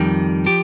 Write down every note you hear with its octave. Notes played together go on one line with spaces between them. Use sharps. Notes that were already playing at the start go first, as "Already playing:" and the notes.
Already playing: F2 D#3 G3
F3 G4